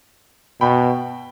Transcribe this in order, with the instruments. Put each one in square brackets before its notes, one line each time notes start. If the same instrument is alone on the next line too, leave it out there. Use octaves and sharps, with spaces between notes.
[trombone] B2 [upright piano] G5 B5